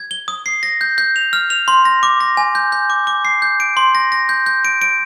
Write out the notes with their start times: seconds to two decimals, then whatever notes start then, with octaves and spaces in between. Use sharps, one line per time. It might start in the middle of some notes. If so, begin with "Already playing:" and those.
Already playing: G#6
0.11 G7
0.28 D#6
0.46 C7
0.63 A#6
0.81 G6
0.98 G6
1.16 F7
1.33 F6
1.50 F7
1.68 C6
1.85 A#6
2.03 D6
2.21 A#6
2.37 G#5
2.55 G6
2.72 G6
2.90 D6
3.07 D6
3.25 C7
3.42 G6
3.60 D7
3.77 C6
3.95 A#6
4.12 A#6
4.29 G6
4.46 G6
4.65 D7
4.82 D7